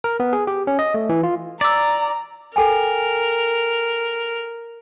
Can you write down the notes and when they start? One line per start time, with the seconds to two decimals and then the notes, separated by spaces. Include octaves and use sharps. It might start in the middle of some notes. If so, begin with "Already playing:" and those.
0.04 A#4
0.20 B3
0.33 G#4
0.47 G4
0.67 C#4
0.79 D#5
0.94 A3
1.09 E3
1.23 F4
1.61 D5 A#5 D6 E6
2.56 A4 A#4 G5 G#5